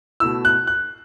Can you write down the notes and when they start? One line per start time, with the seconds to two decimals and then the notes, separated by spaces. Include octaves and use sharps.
0.20 B2 A3 E4 E6
0.45 F#6
0.67 F#6